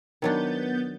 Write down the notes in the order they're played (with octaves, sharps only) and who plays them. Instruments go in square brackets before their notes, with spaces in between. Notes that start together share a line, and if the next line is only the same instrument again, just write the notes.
[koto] D#3 F#3 D4 [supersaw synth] B3 G6 A6